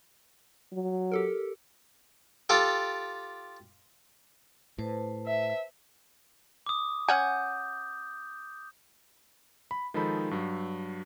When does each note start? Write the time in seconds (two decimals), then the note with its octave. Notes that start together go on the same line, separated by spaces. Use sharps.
0.73 F#3
1.12 G4 A4 A#4
2.49 F4 G4 A4 G5
4.78 A2 B4 C5 A5
5.27 E5
6.66 D6 D#6
7.08 C#4 F#5 G#5 G6
9.71 B5
9.94 D#3 F3 G#3 D#4 A4 B5
10.31 G2 F#3